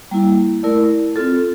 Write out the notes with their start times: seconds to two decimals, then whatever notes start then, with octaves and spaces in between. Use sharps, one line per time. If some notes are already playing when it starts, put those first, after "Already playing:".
0.11 G3 A#3 E4
0.63 A3 E4 A#4 D5
1.16 C4 F4 A4